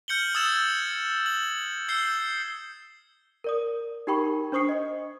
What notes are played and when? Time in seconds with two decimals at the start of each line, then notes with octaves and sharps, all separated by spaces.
0.08 F6 G6 C#7 F#7 G7
0.35 D#6 E6 G#6 A6 E7 F#7
1.26 F#7
1.88 E6 G6 C7 F#7 G7
3.44 A#4 D5 D#6
4.07 D#4 G4 A#4 G5 B5 C#6
4.52 D4 C5 C#6 D#6 C7 C#7
4.69 D#5